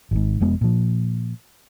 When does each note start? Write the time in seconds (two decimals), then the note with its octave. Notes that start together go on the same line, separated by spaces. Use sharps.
0.11 G#1 G#2
0.40 F1 F2 G#3 B3
0.61 A#2 F3